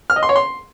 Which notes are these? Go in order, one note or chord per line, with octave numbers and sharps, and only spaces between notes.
F6
D#5
C6
C#5
C6